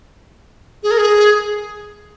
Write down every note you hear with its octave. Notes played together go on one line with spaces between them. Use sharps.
G#4
A#4
G#4